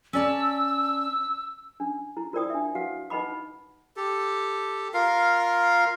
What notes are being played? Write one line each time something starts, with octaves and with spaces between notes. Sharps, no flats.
C#4 D5 A5 E6
C#4 D4
E4
F4 A#4 C5 D5 G5 D#6
D4 E5
F#4 B4 F5 F#5
D#4 B4 D#5 F#5 B5 D6
G4 A4
F4 A#4 F5